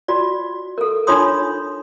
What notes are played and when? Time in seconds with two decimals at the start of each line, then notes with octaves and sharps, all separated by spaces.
0.08 F4 F#4 D5
0.78 A4 A#4
1.07 D4 D#4 F4 C#5 C6 D#6